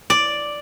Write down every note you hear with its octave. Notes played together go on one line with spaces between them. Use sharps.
D5